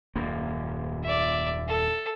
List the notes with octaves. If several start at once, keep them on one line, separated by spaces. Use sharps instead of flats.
D#1 F#2 A#3
D5 E5
A4